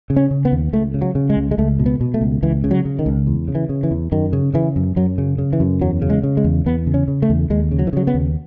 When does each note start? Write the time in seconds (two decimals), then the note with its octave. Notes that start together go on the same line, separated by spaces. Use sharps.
0.10 C#3
0.16 C#4
0.31 C#3
0.45 B3
0.52 D#2
0.73 C#2 A3
0.94 C#3
1.01 F#3
1.15 C#3
1.30 G#3
1.36 C#2
1.51 G#3
1.58 C#2 A3
1.79 B2
1.86 B3
2.01 B2
2.14 A3
2.21 C#2
2.43 C#2 E3
2.64 C#3
2.71 F#3
2.85 C#3
2.99 D#3
3.06 C#2
3.27 E2
3.48 C#3
3.55 E3
3.69 C#3
3.83 E3
3.91 E2
4.12 F#2 D#3
4.33 C#3
4.54 C#3 E3
4.76 F#2
4.96 F#2 F#3
5.18 C#3
5.38 C#3
5.53 E3
5.60 F#2
5.81 E2 F#3
6.02 C#3
6.10 G#3
6.23 C#3
6.37 G#3
6.44 E2
6.66 E2 B3
6.87 C#3
6.94 C#4
7.08 C#3
7.22 A3
7.30 E2
7.50 D#2 G#3
7.71 C#3
7.79 F#3
7.87 E3
7.93 C#3 F#3
8.07 B3
8.14 D#2